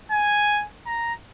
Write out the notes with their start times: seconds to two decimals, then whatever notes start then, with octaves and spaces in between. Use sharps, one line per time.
0.11 G#5
0.86 A#5